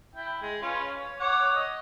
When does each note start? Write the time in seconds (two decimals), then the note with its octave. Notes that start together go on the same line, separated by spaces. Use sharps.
0.15 E4 G5
0.42 G#3
0.62 C#4 F4 B4
0.98 C#5
1.20 C#5 F#5 D6
1.55 D#5